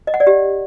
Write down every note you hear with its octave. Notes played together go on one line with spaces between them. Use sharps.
D#5
F#5
D5
G4